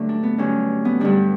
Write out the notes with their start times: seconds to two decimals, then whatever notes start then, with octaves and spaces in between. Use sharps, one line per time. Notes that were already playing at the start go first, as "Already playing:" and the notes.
Already playing: G2 D3 F#3 A3
0.09 D4
0.23 B3
0.38 G2 D3 F#3 C#4
0.85 B3
1.00 G2 D3 G3 D4